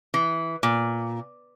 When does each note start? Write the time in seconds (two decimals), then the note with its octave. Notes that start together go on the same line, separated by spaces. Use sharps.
0.14 E3
0.63 A#2